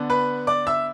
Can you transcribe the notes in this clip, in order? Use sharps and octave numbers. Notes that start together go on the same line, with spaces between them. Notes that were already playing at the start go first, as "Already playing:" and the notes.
Already playing: D3 B3 D4
B4 B5
D5 D6
E5 E6